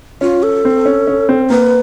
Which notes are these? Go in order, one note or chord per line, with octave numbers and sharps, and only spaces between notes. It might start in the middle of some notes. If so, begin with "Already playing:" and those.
C#4 F4
A4
C4
C#4
C#4
C4
A#3 B4